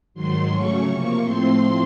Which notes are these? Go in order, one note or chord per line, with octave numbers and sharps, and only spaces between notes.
G#2 D#3 F#3 C6
C#3 F#3 A3 C#4 C#6
C3 F3 A#3 C#6
A2 F3 A3 C4 C6